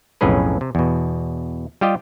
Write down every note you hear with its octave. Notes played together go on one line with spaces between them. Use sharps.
B1 F2 A2 C#4 G#4 B4
C3
E2 B2
G3 F4 G4 D#5